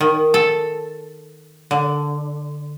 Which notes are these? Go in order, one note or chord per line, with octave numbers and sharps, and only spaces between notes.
D#3
A4
D3